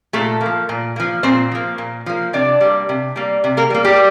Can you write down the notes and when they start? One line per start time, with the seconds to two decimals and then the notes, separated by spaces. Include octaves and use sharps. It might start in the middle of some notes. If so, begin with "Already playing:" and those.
0.13 A#2 A3 A4
0.41 A#3
0.46 F3
0.69 A#2
0.96 F3 A#3
1.23 A#2 C4 C5
1.52 F3 A#3
1.78 A#2
2.06 F3 A#3
2.33 C3 D4 D5
2.61 G3 A#3
2.89 C3
3.16 G3 A#3
3.44 C3
3.57 A#3 A#4
3.70 G3 A#3
3.84 G3 G4